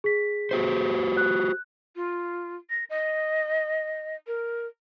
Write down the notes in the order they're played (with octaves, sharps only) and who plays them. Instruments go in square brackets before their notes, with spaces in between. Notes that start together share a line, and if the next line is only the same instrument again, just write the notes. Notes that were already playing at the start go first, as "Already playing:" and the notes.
[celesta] G#4 B6
[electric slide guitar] F#4 G4 C5
[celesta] F#6
[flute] F4
A#6
D#5
A#4